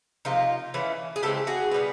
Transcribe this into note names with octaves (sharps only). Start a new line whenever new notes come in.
C3 F3 A#3 D#4 F4
E3 A3 C#4
G#4
C#3 E3 G#3 C4 G4 A4
F#4 G#4
B2 G3 B3